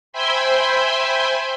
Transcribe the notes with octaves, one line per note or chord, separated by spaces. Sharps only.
C5 E5 G5 G#5 B5 C6